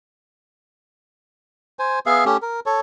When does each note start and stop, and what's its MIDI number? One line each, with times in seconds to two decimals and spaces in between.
1.79 1.99 72
1.79 1.99 80
2.06 2.25 59
2.06 2.25 68
2.06 2.25 76
2.06 2.25 77
2.25 2.37 57
2.25 2.37 61
2.25 2.37 67
2.42 2.60 70
2.66 2.81 69
2.66 2.81 73